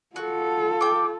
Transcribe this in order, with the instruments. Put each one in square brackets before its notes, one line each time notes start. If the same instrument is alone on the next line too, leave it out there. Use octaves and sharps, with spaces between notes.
[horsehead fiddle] F4 A4 [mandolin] F#4
[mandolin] G5 D6